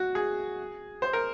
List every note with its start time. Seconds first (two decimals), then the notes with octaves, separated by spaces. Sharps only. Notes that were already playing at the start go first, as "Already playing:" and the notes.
Already playing: F#4
0.15 G#4
1.02 C5
1.13 A#4